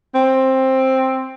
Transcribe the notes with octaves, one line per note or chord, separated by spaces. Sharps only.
C4